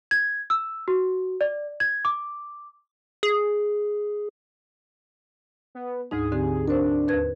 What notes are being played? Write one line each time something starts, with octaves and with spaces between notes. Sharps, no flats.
G#6
E6
F#4
D5
G#6
D6
G#4
B3
D2 G#2 D#4 G#4
D3 C4 G4
D4 A#4 C5
D#2 B4 G#6